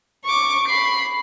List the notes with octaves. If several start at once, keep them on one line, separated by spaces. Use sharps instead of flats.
C#6 D6
B5 C7